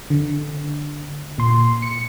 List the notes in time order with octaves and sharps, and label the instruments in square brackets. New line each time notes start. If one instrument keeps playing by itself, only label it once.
[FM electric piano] D3
A#2 C6
C#7